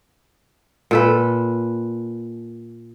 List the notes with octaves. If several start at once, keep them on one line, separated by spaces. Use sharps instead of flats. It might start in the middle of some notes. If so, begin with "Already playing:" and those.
A#2 A4 B4